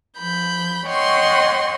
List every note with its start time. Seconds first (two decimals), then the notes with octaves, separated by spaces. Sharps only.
0.17 F3 B5 G6
0.87 C#5 D#5 F#5 G5 C6 C#6